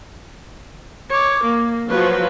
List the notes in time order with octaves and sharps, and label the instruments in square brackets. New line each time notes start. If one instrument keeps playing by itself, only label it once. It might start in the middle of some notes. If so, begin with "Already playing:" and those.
[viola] C#5 D6
A#3
[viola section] F3 F#3 [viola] B4